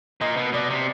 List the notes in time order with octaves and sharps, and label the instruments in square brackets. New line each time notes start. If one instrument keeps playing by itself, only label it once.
[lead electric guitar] A#2 [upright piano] D#5
[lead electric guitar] B2
[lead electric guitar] B2 [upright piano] D5
[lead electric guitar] C3